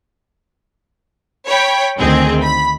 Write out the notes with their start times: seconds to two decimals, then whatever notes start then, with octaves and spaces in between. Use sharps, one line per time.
1.47 C#5 G5 B5
1.99 D2 D#3 C4 G#4
2.43 B5